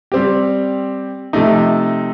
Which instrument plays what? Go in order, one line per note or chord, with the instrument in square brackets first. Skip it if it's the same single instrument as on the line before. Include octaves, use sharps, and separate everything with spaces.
[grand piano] G3 C4 G4
C3 F3 A3 D#4